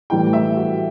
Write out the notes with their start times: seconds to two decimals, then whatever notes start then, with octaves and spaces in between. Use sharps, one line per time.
0.10 A2 E3 G3 G5
0.33 E5
0.57 F#4